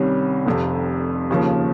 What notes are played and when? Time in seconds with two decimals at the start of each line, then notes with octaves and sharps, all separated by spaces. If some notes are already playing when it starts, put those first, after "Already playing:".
Already playing: C2 C3 D#3 G3 C#4
0.46 F1 F2 C3
1.30 D#2 C#3 F3 A#3